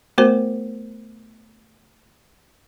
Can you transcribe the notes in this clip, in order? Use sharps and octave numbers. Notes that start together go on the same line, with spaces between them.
A3 B3 F#4 A#4 C5